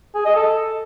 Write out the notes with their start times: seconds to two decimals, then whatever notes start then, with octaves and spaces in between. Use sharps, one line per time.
0.15 G#4
0.25 D#5
0.35 A4